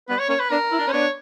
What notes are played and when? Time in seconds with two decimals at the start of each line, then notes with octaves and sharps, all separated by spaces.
0.09 G3 B3 B4
0.19 C#5
0.29 A#3 C#4 C#5
0.40 B4
0.50 B3 D4 A#4
0.71 E4
0.79 D4
0.86 C#4
0.92 B3 D4 C#5